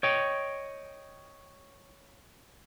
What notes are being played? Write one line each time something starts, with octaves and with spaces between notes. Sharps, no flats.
C#5 D#5 G5